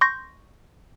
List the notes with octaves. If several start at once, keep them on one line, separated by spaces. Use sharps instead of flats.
C6 C#6 G6 A#6